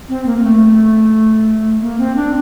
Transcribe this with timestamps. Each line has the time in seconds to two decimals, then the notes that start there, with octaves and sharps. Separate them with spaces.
0.09 C4
0.26 A#3
0.38 A#3
0.43 A3
1.81 A#3
1.99 C4
2.16 D4